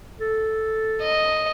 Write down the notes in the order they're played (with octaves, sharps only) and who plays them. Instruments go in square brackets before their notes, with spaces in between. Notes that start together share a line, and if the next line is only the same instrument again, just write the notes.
[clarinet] A4
[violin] D#5